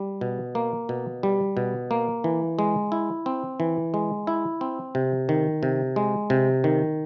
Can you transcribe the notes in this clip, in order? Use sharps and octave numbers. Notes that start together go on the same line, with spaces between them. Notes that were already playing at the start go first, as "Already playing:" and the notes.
Already playing: G3
B2
A#3
B2
G3
B2
A#3
E3
G#3
E4
C4
E3
G#3
E4
C4
C3
D#3
C3
G#3
C3
D#3